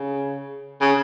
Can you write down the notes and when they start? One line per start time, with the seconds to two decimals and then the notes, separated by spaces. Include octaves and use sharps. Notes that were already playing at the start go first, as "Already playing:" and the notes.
Already playing: C#3
0.81 C#3